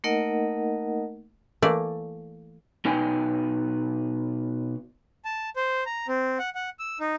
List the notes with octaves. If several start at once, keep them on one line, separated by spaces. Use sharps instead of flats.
A3 A#3 D#4 A#4 D#5 F#5
E3 A3 A#3 D5
B2 D#4 B4 G5 G#5
A5
C5
A#5
C4
F#5
F#5
E6
D#4